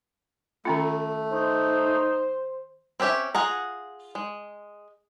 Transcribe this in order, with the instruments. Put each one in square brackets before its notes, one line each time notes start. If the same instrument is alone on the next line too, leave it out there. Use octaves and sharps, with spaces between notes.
[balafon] D#3 C#4 F4 [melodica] A3
[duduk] D#4 [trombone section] C5
[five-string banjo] C4 C#4 G4 C#5 E5
F4 G#4 F#5 A#5
G#3